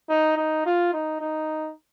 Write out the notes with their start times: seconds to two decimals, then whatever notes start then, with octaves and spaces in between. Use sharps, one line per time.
0.09 D#4
0.37 D#4
0.66 F4
0.93 D#4
1.21 D#4